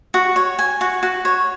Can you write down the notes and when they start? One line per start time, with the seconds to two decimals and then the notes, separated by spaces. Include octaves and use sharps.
0.14 F#4
0.36 C#5
0.59 G#5
0.81 F#4
1.03 F#4
1.25 C#5